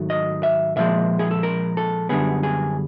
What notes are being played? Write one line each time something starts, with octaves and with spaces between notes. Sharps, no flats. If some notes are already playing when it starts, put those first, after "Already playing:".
Already playing: G#2 D#3 F#3 A3
D#5
E5
A#2 F3 G#3 E5
G#4
A4
A#4
A4
F#2 D3 G3 B3 G#4
G#4